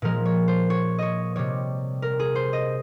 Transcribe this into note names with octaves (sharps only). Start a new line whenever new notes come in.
A#2 F3 G#3 A#4
C#5
C5
C#5
C#5 D#5
C3 G3 C#5
A#4
G#4
C5
D#5